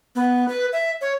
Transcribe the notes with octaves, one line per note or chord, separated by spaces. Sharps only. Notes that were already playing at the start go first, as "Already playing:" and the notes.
B3
B4
E5
C#5